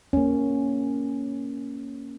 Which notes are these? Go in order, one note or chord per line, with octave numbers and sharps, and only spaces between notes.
A#3 C#4